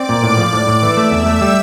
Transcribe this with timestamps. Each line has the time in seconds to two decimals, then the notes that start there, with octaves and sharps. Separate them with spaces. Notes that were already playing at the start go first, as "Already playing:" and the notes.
Already playing: C4 D5 D6
0.09 A#2
0.23 A2
0.38 F3
0.53 A2
0.67 A2
0.82 E3 E5 E6
0.97 A3
1.11 E2
1.26 A3
1.41 G3